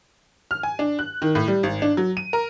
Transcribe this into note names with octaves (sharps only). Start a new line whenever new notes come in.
F6
G#5
D4
F#6
D#3
A2
G3
G#1
D4
F#3
D#7
A#4